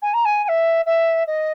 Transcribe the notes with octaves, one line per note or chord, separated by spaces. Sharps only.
G#5
A#5
G#5
G#5
E5
E5
D#5